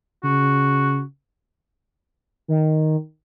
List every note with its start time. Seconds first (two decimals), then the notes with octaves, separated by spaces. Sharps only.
0.24 C#3 F#4
2.48 D#3